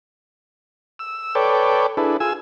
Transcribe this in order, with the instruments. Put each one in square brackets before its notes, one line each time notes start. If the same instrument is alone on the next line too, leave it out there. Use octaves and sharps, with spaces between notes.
[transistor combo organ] E6
A4 B4 C#5 D5 G5
D4 E4 G#4 A4 B4
F4 G#4 G#5 E6